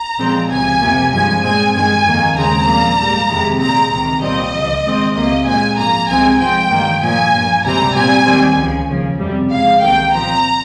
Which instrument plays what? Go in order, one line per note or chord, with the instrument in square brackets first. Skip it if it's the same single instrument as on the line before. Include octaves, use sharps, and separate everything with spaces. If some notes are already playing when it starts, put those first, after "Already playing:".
Already playing: [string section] A#5
A#2 F3 G#3 C4
C#2 C3 F3 G#5
F2 C3 F3 A#3
G2 F3 G#3 G#5
A#2 G#3 C4 G#5
G2 D#3 G#3 G#5
F2 D#3 A#3
D#2 C#3 G#3 C4 A#5
A#2 F3 A#3
G#2 G3 A#3
F2 C3 D#3 G#3
A#2 G#3 C4 A#5
C#2 C3 D#3 A#5
C2 A#2 G3 C4 D#5
C#2 C#3 F3
G#2 D#3 G#3 C4
C#2 C3 F3 A#3 D#5
A#2 G#3 C4 G#5
G#2 F3 A#3 A#5
C2 C3 F3 G#3 C4 G#5
G#2 F3 C4 G5
G2 D#3 A#3
A#2 F3 A#3 G#5
G2 F3 A#3
C#2 C3 G3 C4 A#5
A#2 G3 C4 G#5
D#2 D#3 G3 C4
C#2 C#3 F3
D#2 C#3 F3
F2 C3 G3
F2 C#3 G#3 F5
C2 C3 D#3 A#3 G5
A#2 F3 C4 A#5